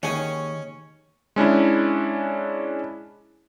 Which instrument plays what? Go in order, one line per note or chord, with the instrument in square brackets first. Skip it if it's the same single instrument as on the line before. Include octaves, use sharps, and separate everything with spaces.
[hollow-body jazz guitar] D#2 D#3 G#4 [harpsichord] C#4
[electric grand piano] G#3 C#4 D4 E4